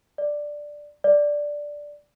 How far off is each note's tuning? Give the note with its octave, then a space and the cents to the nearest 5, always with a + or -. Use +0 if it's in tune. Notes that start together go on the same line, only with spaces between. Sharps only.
D5 +5
D5 +0